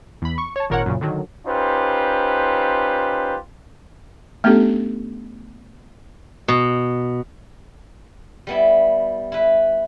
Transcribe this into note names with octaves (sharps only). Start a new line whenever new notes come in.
E2 B5
C#6
C#5 A5
G#1 A#2 A#4 C#5 F#5
F#2 A#2 C#3
D3 D#3 F#3
C#4 D#4 F4 G4 B4 C5
A3 B3 C#4 D4 G4 A4
B2
G3 B3 E4
E4 B4